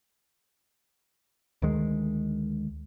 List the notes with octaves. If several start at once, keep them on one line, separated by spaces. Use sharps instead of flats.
D2 D#3 G#3